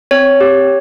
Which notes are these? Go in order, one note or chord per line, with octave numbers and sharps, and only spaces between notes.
C4 C#5
G4